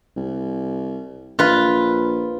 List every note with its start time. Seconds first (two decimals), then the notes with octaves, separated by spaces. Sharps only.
0.16 C2
1.39 A#1 F4 B4